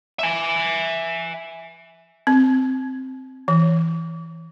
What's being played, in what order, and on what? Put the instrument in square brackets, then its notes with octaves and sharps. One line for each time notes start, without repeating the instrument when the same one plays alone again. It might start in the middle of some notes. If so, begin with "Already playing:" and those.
[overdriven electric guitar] E5 G#5
[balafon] C4
E3